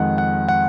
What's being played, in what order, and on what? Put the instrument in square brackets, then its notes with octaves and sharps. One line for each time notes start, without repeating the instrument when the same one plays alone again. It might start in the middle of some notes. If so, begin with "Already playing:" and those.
Already playing: [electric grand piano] F2 D#3 G#3 F#5
F#5
F#5